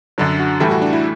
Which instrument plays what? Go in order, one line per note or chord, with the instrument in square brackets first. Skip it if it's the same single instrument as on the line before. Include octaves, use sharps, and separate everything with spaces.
[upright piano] F#2 D3 F#3 [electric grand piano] D4
[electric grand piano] F#4
[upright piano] A2 E3 G3 [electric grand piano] A4
[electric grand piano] F#4
D4
E4